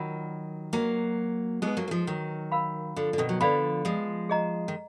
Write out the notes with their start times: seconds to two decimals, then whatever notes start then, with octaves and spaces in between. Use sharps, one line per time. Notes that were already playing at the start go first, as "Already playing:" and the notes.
Already playing: D#3 F#3 F4 A#4 D5 F#5 B5
0.73 F#3 A#3 D4 G#4 B4 D#5 A#5
1.62 G#3 B3 D#4 G#4 B4
1.77 F#3 A#3
1.88 A#3
1.91 F3 G#3
2.07 D#3 F#3
2.52 A#4 F5 B5
2.96 D3 F3
3.13 D3
3.18 B2 D#3
3.29 F#3
3.41 D3 F3 B4 D5 F5 B5
3.85 F3 G#3
4.29 G#4 D#5 A#5
4.68 D#3